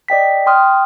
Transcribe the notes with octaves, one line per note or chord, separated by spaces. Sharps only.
D5 D#5 G5 B6
G5 C6 D#6 F6